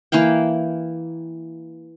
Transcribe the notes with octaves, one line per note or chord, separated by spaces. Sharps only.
E3 A#3 F5 G5